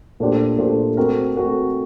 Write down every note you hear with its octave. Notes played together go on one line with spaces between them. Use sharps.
A#2 A3 D4 G4 C5
A#2 A3 D4 G4 C5
A3 C4 F#4 A#4
A3 C4 F#4 A#4